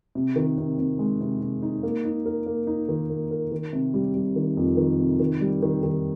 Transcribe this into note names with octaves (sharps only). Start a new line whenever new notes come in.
C3
D#3
C3
C3
G#3
C3
C3
D#4
A#3
D#4
A#4
A#3
D#4
D#3
A#3
A#4
D#3
C3
G3
G3
D#3
F2
D#3
C3
D#3
G3
D#3
D#3